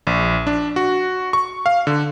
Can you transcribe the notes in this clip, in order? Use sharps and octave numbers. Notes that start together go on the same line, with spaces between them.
A#1
D4
F#4
C#6
F5
D3